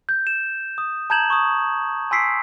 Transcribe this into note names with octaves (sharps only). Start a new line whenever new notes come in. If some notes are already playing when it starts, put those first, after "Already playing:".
G6
E7
D#6
A5 A#5 G6 G#6 E7 F#7
C#6 D#6
G#5 C6 E6 B6 C7 D7